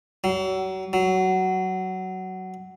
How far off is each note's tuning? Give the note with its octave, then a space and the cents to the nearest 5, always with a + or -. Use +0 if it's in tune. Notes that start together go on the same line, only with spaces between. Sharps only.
F#3 +35
F#3 +15